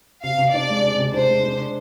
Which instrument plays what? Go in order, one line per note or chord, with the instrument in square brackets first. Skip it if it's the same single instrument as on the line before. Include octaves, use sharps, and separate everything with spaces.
[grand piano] C3 [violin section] F5
[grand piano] C3
[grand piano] D4 [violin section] D5
[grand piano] G#3
C3
C3
[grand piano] D4 [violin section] C5
[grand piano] G#3
D4